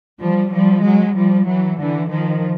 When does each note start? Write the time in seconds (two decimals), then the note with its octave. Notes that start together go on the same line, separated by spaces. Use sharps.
0.22 F3 G3
0.53 F3 G3
0.85 F#3 G#3
1.16 F3 G3
1.48 E3 F#3
1.79 D3 E3
2.11 D#3 F3